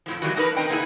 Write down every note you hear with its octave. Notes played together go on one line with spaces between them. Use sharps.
F2 A2 F3
E3 G3 A#3 D#4 F#4
D4 D#4 A#4 B4
C4 D#4 G5
A#3 B3 D#4 E4 G#4